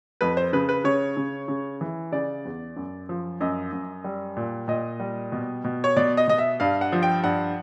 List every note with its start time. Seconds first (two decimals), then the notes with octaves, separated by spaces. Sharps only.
0.21 F2 B4
0.37 C5
0.53 C#3 B4
0.69 B4
0.84 C#3 C#5
1.17 C#3
1.48 C#3
1.81 E3
2.12 C#3 D5
2.45 E2
2.76 F#2
3.09 F3
3.40 F#2 D#5
3.72 F#2
4.04 G3
4.37 A#2
4.68 A#2 D#5
5.00 G3
5.32 B2
5.64 B2
5.84 C#5
5.96 B2 D5
6.17 D#5
6.27 B2 D#5
6.38 E5
6.60 G2 F5
6.81 F#5
6.92 F3
7.03 G5
7.24 G2 F#5